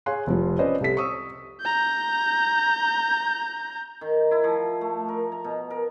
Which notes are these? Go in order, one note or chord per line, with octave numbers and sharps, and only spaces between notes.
G#4 C#5 F5 G#5 C6 F#6
F1 F3
C#4 B4 C5 D5 D#5
C2 C3 A4 B6
C#6 D#6 E6
A#5 G6
D#3
E4
F3
A3
A#4
A#5
B2
A#4